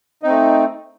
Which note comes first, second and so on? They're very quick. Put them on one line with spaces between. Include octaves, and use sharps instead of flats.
D#4 C4 A3